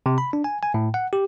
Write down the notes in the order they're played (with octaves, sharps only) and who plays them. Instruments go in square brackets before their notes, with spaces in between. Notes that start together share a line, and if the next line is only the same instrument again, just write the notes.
[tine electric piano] C3
B5
D4
G#5
G#5
A2
F#5
G4